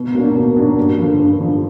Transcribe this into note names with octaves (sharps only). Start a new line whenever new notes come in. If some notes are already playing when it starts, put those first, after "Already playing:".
Already playing: B2
F#3 A#3 D4
B2
F#3 A#3 D4
G2
D3 F3
G2
D3 F3